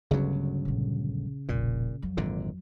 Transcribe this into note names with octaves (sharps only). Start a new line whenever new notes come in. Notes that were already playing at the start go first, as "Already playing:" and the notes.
G1 D2 C#3 F#3
A#1 G3
E1 A#1 A#2
F2 F#3
G#1 A#2 D3